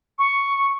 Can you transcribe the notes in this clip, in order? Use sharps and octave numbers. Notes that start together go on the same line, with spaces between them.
C#6